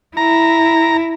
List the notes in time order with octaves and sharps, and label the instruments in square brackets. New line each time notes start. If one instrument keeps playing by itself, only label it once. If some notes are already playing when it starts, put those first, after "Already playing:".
[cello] E4 [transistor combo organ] A#5